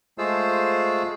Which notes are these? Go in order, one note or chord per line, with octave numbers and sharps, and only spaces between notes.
G#3 A3 F4 G#4 C5 E6